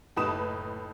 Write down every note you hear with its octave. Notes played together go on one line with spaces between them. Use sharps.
F#1 A2 D#4 B4 D#6 E7